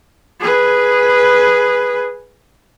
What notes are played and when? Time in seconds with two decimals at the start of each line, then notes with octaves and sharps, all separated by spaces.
0.40 G#4 B4